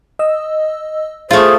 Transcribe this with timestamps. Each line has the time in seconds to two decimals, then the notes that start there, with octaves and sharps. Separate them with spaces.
0.19 D#5 E6
1.31 A3 F4 G#4 C5